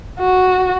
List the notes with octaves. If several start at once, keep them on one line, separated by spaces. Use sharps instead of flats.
F#4